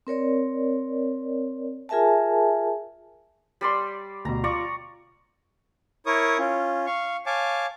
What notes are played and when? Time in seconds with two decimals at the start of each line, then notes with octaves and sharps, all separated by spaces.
0.07 C4 A#4 C#5 D5
1.89 F4 G#4 A#4 E5 G#5 A5
3.61 G3 D5 C6
4.25 D2 B2 A#5
4.44 F4 D5 A#5 C#6
6.06 E4 A#4 C#5 C#6 D#6
6.38 C#4 F4
6.87 F5 C#6
7.26 C#5 F5 G#5 A5 D6